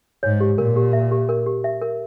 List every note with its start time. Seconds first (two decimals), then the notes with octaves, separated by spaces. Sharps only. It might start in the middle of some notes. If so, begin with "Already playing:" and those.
0.23 G#2 C#5
0.40 G4
0.58 A#2 A#4
0.76 G4
0.93 E5
1.11 G4
1.29 A#4
1.46 G4
1.64 E5
1.81 A#4